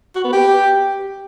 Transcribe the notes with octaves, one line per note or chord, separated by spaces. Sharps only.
F#4
B3
G4